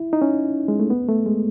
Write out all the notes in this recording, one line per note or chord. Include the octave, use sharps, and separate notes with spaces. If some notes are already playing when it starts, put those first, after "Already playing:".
Already playing: E4
D#4
C#4
G#3
A3
B3
A3
G#3